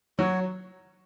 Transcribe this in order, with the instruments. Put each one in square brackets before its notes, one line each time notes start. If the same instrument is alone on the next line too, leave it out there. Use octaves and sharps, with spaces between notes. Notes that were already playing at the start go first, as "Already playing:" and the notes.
[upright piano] F#3 [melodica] F#4 C#5